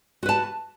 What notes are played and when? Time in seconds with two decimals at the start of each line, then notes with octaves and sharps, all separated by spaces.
0.23 F#4
0.26 B4
0.29 A5